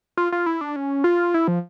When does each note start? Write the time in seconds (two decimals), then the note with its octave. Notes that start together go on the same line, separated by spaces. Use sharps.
0.17 F4
0.32 F4
0.46 E4
0.61 D4
0.76 C#4
1.04 F4
1.34 E4
1.48 F3